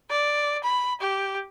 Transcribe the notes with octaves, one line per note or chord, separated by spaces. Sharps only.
D5
B5
G4